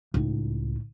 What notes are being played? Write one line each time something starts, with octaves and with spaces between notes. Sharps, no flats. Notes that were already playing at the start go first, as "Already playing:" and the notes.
C#2 A2 D#4